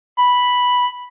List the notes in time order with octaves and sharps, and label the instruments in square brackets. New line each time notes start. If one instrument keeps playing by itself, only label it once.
[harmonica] B5